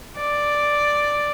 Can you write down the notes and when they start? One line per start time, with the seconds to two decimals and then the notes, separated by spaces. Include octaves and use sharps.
0.17 D5